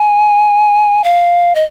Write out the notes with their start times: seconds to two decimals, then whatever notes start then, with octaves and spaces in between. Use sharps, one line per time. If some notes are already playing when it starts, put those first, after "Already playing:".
Already playing: G#5
1.04 F5
1.55 D#5